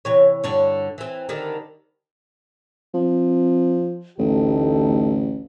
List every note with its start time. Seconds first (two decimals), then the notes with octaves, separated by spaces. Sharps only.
0.05 C3 E3 C#5
0.44 G2 D3 C#5
0.98 E3 C4
1.29 D3 D#3 G3
2.94 F3 C4
4.19 A1 D2 D#4 G4 A4